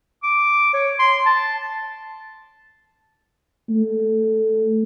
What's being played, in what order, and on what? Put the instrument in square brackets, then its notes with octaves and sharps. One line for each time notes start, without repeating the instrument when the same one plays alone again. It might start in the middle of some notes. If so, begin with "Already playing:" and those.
[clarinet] D6
C#5
C6
A5
[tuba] A3